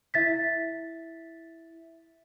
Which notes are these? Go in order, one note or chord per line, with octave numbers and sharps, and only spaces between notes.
E4 E5 A6 B6